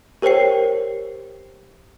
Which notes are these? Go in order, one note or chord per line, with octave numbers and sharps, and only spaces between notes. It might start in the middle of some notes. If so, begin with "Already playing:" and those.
G4 A#4 C5 C#5 G5 C7